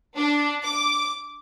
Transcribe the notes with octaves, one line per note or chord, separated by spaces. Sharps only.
D4
D6